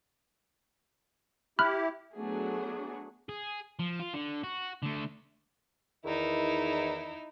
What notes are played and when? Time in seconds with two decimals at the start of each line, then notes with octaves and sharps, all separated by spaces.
1.59 E4 G4 B5 F6 F#6
2.16 F#3 A3 B3 D4 F#4 G#4
3.29 G#4
3.79 F3
4.00 F4
4.14 D3
4.43 F#4
4.83 D3 A3
6.05 E2 D#3 D#4 E4